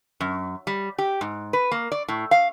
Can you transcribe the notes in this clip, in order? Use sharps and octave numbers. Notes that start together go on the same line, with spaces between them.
F#2
G3
G4
G#2
B4
A#3
D5
A2
F5